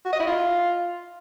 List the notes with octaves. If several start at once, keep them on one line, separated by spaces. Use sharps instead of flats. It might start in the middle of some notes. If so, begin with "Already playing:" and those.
F#4
D#5
E4
F4